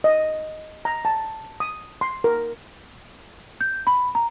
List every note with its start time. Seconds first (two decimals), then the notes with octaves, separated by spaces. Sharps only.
0.04 D#5
0.85 A#5
1.05 A5
1.60 D#6
2.01 C6
2.24 A#4
3.61 G6
3.87 B5
4.15 A#5